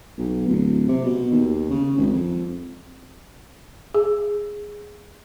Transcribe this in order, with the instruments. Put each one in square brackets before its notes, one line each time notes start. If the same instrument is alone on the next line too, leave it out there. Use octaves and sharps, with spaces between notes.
[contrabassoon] B1
D1
C3
B2
D#2
C#3
G#1
F2
[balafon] G#4